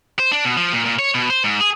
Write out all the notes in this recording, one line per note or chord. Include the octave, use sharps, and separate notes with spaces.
C5
D4
B2
F3
A#2
A#2
C#5
B2
C5
G#2
G#4